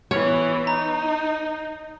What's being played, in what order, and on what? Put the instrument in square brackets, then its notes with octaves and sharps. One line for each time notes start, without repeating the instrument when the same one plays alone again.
[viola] E3 B3 [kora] C#5
[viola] D#4 [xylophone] A#5